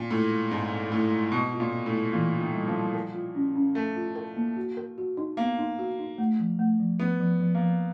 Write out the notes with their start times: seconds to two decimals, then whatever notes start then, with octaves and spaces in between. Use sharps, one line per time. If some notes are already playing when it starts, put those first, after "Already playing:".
Already playing: A#2 C4
0.10 A2 G#3
0.30 G#3
0.51 G#2 C4
0.71 C4
0.92 A2 G#3
1.12 G#3
1.32 B2 C4
1.53 F4
1.60 A#2
1.72 C4
1.86 A2
1.93 G3
2.13 A#2 E3
2.34 F4
2.40 D#3
2.54 G3
2.68 F3
2.74 G3
2.94 A#4
3.15 F4
3.35 C#4
3.56 C#4
3.75 A3 A#4
3.96 F4
4.16 A#4
4.36 A#3
4.57 F#4
4.77 A#4
4.98 F#4
5.17 D#4
5.37 A#3 B3
5.59 D#4
5.79 F#4
5.99 D#4
6.18 A3
6.39 F3
6.59 A3
6.80 F3
7.00 F3 B3
7.20 F3
7.40 F3
7.55 A#3
7.61 F3